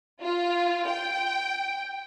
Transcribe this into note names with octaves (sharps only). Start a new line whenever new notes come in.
F4
G5